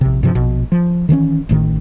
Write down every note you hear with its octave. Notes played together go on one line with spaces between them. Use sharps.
A#1 C3
G2 C3 F3
A#1 B2
F3
D#3 E3 G3 C#4
A1 A2 D#3